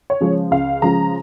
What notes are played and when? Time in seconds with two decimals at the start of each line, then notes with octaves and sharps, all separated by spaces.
0.10 C#5
0.20 C#3 F3 G#3
0.51 C#2 F5
0.82 C#3 F3 G#3 A#5